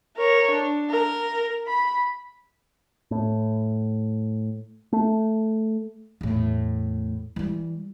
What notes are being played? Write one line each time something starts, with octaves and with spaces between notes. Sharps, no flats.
A#4 C#5
D4
A#4
B5
A2
A3
E2 A2
E3 G3